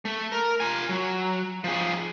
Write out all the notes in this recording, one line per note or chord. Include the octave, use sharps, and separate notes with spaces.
A3
A#4
F4 G#5
F#3
F3 G#4